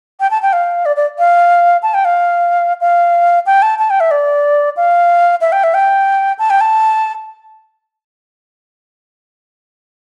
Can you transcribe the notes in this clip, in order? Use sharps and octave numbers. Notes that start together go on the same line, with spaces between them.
G5
A5
G5
F5
D5
D5
F5
A5
G5
F5
F5
G5
A5
A5
G5
E5
D5
F5
E5
G5
E5
G5
A5
G5
A5